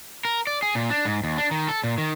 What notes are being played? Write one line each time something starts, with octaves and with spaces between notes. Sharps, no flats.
A#4
D5
G#4
A#2
D4
G#2
D#2
D4
D#3
A4
A#2
D#3